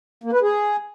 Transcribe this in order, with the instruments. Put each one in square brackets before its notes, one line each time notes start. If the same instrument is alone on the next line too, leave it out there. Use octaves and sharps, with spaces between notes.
[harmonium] A#3
B4
G#4